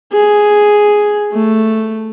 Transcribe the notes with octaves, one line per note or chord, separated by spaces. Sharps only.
G#4
A3